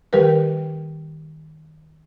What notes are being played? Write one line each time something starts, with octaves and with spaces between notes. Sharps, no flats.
D#3 G3 G4 A#4 B4